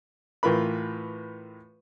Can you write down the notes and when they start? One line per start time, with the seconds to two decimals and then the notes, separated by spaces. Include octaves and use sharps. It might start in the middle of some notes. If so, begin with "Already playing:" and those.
0.43 A2 E3 F4 A#4 B4 B5